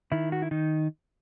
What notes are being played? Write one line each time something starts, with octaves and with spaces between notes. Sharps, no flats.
D#3 E4
F#4
E4
D#3 D#4